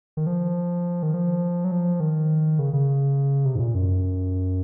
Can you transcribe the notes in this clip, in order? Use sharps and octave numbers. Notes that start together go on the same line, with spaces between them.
D#3
F3
D#3
F3
F#3
F3
D#3
C#3
C#3
C3
G#2
A#2
F#2